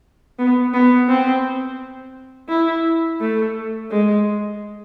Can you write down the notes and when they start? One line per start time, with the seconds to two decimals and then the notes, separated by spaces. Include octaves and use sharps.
0.39 B3
0.73 B3
1.09 C4
2.49 E4
3.21 A3
3.91 G#3